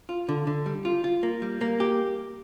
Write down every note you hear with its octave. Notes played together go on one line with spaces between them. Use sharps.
F4
D3
D3
G3
F4
F4
A#3
G3
A#3
G4